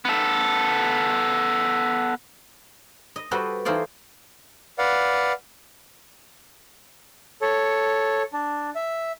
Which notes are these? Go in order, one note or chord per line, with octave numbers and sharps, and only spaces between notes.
B3 A4
D#5
G3 F#4 A4 B4 C5 D#5
E3 A3 D#4 F4 C5 D5
B4 D5 F5 F#5
A4 C#5
D4
E5